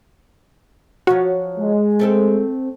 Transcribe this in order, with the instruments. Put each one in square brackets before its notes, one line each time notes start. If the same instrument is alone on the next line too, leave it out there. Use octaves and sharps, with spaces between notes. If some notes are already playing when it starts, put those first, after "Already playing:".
[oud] F3 F#3 C#5 [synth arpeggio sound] F#4
[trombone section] G#3
[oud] A3 C4 A4